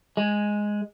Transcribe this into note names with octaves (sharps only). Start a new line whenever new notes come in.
G#3